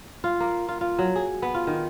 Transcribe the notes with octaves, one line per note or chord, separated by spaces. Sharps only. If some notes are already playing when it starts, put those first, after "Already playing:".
F4
A#3
F4
F4
F#3
G#4
B3
F4
D#3